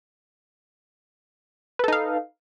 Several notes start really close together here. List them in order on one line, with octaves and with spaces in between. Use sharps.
B4 A4 D#4 F5